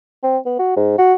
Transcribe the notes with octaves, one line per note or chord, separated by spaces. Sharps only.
C4
B3
F#4
G#2
F#4